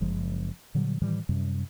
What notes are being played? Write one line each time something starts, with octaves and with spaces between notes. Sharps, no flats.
F#1 F3 G#3
A#2 D3 F#3 G3
A2 D#3 E3 G3
F#2 C3 G3